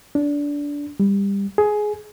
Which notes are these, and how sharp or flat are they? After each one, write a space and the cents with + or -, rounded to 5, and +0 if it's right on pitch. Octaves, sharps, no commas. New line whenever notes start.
D4 -20
G3 +25
G#4 +15